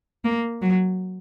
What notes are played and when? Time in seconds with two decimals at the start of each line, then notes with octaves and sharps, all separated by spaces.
0.24 A#3
0.62 F#3